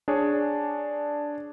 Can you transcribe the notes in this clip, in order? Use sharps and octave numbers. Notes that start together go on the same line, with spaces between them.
D4 G#4 C#5